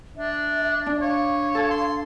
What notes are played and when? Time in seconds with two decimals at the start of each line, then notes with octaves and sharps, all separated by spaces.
0.17 D4 E5
0.86 D4 D5
1.01 C#5 F5
1.55 A4 A5
1.70 C6